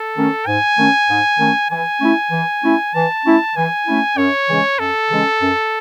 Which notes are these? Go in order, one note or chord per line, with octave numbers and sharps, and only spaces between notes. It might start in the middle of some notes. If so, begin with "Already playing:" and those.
Already playing: A4
D#3 A3 C#4
G#2 G#5
D#3 A3 C#4
G#2
D#3 A3 C#4
E3 G#5
A3 C#4 E4
E3
A3 C#4 E4
E3 A5
A3 C#4 E4
E3 G#5
A3 C#4 E4
F#2 C#5
C#3 E3 G#3 C#4
F#2 A4
C#3 E3 G#3 C#4
F#2